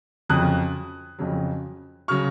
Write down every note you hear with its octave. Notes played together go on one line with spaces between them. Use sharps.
F2 C#3 F#3 D#6 F#6
F2 C#3 F#3
C#3 F#3 C#6 F6